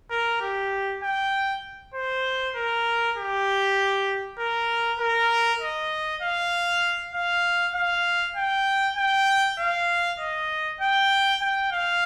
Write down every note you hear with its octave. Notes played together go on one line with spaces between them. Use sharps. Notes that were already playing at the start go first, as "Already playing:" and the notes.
A#4
G4
G5
C5
A#4
G4
A#4
A#4
D#5
F5
F5
F5
G5
G5
F5
D#5
G5
G5
F5